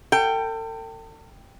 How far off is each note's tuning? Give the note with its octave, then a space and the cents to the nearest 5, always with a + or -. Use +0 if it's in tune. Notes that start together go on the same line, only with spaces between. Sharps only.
A4 +40 G5 +5